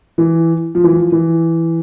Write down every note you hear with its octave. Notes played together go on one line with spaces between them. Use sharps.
E3
F3
E3
F3
E3